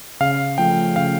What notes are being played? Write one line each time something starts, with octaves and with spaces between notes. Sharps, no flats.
C#3 F5
F3 A3 G5
C#3 F5